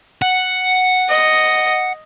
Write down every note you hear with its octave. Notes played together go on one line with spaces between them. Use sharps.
F#5
D#5